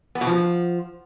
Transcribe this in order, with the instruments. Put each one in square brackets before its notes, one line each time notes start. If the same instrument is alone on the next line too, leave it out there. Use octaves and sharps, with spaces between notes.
[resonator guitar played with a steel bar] B3
B2
F3